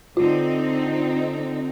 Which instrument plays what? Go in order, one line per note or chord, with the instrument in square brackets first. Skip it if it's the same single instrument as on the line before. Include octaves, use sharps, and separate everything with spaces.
[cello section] D3 C4 D#4 [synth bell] F4